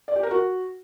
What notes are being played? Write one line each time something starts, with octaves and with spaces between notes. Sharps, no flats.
D5
G4
A#4
F#4